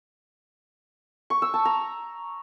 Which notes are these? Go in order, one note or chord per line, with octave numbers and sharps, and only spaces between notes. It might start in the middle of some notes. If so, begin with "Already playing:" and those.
C#6
E6
A5
A#5